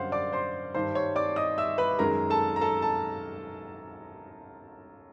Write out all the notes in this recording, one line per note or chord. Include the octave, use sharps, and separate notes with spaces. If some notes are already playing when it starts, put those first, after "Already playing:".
Already playing: F#2 D3 G3 C5 F5 F#5 C6
D5 D6
C5 C6
G2 D#3 G3 C5 C6
C#5 C#6
D5 D6
D#5 D#6
E5 E6
B4 B5
F#2 D#3 G#3 A#4 A#5
A4 A5
A#5
A4 A5
A5